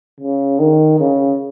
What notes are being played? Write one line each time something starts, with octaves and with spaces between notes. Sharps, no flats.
C#3
D#3
C#3